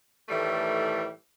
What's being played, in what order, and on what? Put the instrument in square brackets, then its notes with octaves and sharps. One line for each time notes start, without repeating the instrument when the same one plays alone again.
[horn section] A2 D#3 E3 G3 A3